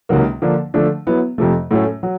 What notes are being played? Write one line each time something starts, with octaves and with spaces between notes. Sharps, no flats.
C#2 C3 D#3 F#3 A#3
D3 F3 A#3 D4
D3 F3 A3 D4
F#3 B3 E4
F2 C3 F3 A3
A2 F#3 A3 C#4
F#3